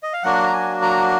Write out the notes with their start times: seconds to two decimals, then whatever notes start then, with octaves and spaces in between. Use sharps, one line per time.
0.03 D#5
0.13 F5
0.23 F#3 A#3 D4 F#4 F#5
0.46 A#5
0.53 G#5
0.82 A#5